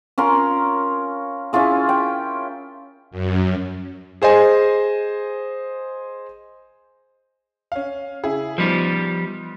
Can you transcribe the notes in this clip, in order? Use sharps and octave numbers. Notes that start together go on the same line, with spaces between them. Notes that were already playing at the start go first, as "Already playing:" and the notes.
C#4 F4 A#4 C6
C#4 E4 F4 G#4
G5
F#2
G#4 C5 D#5 G#5
C#4 F5
C#3 E4 G#4
F3 G3 B3 D#4 C5